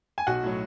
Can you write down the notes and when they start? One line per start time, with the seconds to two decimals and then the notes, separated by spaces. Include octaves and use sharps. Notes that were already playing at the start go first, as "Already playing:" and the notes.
0.18 G#5
0.27 B1 F#4 F#5
0.43 A2 F#3